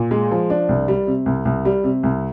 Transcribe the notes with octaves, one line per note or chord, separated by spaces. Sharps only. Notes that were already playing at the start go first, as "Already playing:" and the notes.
Already playing: A#2
G#3
F3
D4
C2
G3
C3
C2
C2
G3
C3
C2